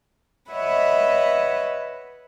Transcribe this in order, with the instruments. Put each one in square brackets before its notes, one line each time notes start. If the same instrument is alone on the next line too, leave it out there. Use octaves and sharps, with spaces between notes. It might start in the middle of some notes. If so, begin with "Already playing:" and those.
[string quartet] B4 C#5 D#5 E5 F#5 B5